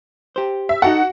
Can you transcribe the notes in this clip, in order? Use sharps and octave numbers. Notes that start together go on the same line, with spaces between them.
G4 C5
E5
D#4 F#4 A4 F#5